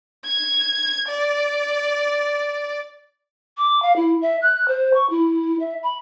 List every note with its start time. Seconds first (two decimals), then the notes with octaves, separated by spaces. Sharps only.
0.25 G#6
1.08 D5
3.57 D6
3.82 F5
3.96 E4
4.22 E5
4.42 F#6
4.68 C5
4.94 C#6
5.10 E4
5.60 E5
5.83 B5